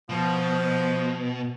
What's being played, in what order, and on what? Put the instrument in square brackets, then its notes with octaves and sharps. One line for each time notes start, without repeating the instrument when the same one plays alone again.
[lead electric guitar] B2 [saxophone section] F3